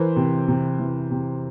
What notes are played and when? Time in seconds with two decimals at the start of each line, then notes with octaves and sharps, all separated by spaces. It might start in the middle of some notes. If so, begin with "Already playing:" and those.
Already playing: E3 A#4 C5
0.16 C3
0.48 C3
0.79 E3
1.11 C3